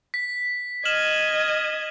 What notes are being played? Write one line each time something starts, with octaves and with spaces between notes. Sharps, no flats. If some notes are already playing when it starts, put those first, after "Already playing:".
B6
D#5 F6 G#6 E7 F#7